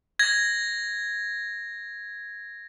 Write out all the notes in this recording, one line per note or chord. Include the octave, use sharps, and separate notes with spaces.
G#6 A#6